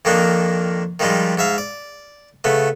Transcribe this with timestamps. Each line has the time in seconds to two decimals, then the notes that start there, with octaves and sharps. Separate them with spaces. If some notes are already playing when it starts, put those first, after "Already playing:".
0.05 F2 D#3 A#3 D4 D#4
0.99 D#3 F3 G3 G#3 D#4
1.37 G#2 E5 F5
1.58 D5
2.44 C#3 A3 B3